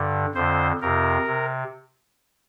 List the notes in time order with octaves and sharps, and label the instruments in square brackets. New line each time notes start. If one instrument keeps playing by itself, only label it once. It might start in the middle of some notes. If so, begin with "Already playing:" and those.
Already playing: [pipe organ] G2 D3
F2 D3 C5
F2 C3 A#4
C3